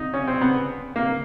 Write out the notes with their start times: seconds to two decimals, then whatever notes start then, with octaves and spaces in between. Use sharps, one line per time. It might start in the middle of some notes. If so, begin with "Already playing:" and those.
Already playing: D#4
0.14 C#4
0.27 C4
0.41 B3
0.96 A#3